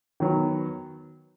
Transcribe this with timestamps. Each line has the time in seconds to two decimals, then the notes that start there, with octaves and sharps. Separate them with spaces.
0.20 D#3 F#3 B3